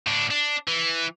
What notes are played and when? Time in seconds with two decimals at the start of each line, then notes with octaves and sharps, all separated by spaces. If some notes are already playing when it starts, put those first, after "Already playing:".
0.07 A2 D4
0.31 D4
0.68 E3